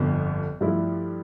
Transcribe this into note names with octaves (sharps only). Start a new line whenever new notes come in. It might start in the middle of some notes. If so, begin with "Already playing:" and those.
Already playing: G1 F2 D3 F3 B3
G2 F3 A3 E4